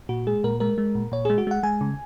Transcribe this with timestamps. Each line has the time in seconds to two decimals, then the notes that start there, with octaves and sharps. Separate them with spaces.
0.09 A#2 F#4
0.27 G#3 G#4
0.44 A#2 A#4
0.60 G#3 A#4
0.78 G#3
0.95 A#2
1.12 A#2 C#5
1.25 G#3 G#4
1.38 F#4
1.47 G#3 F#5
1.63 G#3 G#5
1.81 C#3